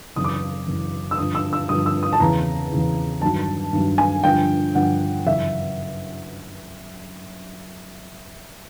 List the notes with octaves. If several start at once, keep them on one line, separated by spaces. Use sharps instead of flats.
F#2 C#3 E3 D#6
D6
D#6
F#2 C#3 E3
E6
G2 D3 F3 D#6
E6
E6
G2 D3 F3 D#6
E6
D#6
A5
E2 C#3 E3 A#5
E2 C#3 E3
G2 D#3 F#3 A5
G2 D#3 F#3
G#5
G2 D3 F3 G5
G2 D3 F3 F#5
F#2 C#3 E3 E5